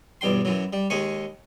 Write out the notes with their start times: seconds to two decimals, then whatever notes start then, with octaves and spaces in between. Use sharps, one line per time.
0.21 B1 E2 G2 G5 C6
0.45 F#2 E3 F#3
0.73 G3
0.90 D#2 D#3 G#3 G#5 C#6